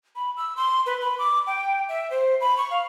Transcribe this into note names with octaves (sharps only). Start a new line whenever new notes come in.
B5
E6
C6
B4
B5
D6
G5
E5
C5
B5
C#6
F5